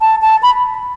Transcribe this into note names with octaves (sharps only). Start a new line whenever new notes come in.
A5
A5
B5